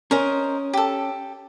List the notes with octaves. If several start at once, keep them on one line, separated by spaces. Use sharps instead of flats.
C#4 A#4 C5 D#5
G4 A4